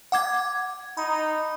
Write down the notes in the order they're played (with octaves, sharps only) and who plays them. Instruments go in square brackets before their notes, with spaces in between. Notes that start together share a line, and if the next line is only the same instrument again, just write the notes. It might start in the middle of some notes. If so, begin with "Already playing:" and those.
[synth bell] F#5 D6 G#6
[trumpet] D#4 [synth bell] B5